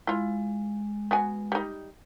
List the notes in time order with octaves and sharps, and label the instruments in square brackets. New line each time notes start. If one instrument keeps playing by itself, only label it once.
[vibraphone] G#3 [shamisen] E4 F4
[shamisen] B3 F#4 G#5
G3 D#4